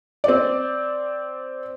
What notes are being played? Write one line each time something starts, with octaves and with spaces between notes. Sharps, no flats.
C4 D5